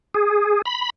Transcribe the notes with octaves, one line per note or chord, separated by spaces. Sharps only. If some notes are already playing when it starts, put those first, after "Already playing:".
G#4
B5